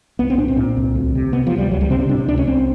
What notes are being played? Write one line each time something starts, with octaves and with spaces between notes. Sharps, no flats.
C2 B3
C4
A#2 D4
C4
A#2
C2
D2
C3
C3 B3
F3
D2
G3
C#2 F#3
G3
C3 C4
C#4
C3 D4
C#4
C#2 D4
C#4
C2 C4